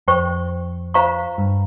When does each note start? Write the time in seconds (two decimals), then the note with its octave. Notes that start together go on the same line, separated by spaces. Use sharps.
0.08 F2 C5 G5 C#6
0.94 F4 C5 F5 A#5 C#6
1.38 G2